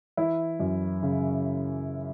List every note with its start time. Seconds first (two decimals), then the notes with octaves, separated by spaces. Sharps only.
0.17 E3 E4
0.60 F#2
1.03 C#3